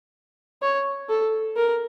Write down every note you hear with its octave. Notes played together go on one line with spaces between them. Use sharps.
C#5
A4
A#4